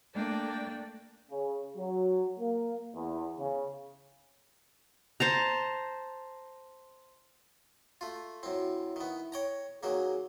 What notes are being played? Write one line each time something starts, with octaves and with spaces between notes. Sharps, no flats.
A3 A#3 D4 D5 G5
C#3
F#3
A#3
E2
C#3
C5 A5 A#5
A3 F4
F#2 C4 E4
D#3 B3
C#5 G5 A#5
D#3 F#3 A#3 G#4